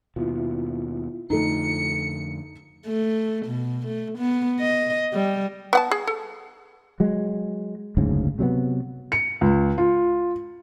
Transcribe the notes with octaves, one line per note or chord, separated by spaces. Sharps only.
D#2 B2 E4 F4
F2 D3 A3 D#4 A4 C#7
A3
B2
A3
B3
D#5
G3
B3 F#5 A5
G#4
A4
F#3 G#3
F#1 D2 G#2 C#3
C3 F#3 G3 B3
C#7
C#2
F4